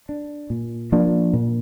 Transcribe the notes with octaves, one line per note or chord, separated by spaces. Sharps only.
D4
A#2
F3 A#3 D4
A#2